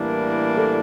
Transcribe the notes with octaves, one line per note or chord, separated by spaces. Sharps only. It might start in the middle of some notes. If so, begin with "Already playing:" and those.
Already playing: A2 E3 G3 A#3 D4 A#4
A4